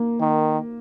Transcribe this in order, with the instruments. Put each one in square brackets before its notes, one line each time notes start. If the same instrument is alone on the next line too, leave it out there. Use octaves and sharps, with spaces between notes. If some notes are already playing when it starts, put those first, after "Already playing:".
Already playing: [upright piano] A#3
[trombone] D#3